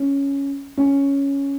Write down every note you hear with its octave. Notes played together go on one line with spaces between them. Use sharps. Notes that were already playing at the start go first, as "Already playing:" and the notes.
Already playing: C#4
C#4